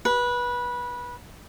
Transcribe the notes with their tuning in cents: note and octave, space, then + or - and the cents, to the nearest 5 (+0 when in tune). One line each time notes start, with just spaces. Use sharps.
B4 -20